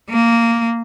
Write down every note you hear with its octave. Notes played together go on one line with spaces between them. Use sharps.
A#3